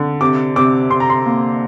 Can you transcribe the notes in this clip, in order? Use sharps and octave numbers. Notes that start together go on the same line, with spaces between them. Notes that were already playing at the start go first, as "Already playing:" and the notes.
Already playing: D3
C3 D6
C3 D6
C3 C6
A#5
C6
A#3